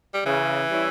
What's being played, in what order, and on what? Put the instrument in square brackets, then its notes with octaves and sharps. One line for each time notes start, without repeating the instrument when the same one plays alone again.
[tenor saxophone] G3
[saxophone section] C#3 [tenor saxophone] E3
[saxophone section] G3 C#4 E4